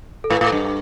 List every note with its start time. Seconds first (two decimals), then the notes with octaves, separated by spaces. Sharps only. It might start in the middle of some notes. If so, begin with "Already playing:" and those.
0.24 A4
0.30 A2 B4
0.41 A2
0.47 A4
0.52 G2